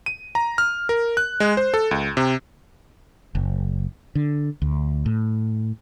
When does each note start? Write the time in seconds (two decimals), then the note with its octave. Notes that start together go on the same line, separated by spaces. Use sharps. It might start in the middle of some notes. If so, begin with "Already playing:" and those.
0.06 D#7
0.35 A#5
0.58 F6
0.89 A#4
1.17 F#6
1.40 G#3
1.57 C5
1.74 A4
1.91 C#2
2.17 C3
3.35 F#1
4.15 D3
4.62 D2
5.06 A2